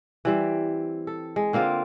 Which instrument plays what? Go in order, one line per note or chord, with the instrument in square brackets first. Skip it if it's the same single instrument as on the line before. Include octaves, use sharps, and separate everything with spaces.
[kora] E3 G3 C4
A4
G#3
D3 A#3 C4 F4